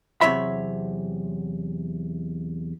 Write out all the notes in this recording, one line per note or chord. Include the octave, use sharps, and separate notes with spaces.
E2 C3 F#3 C#5 E5 B5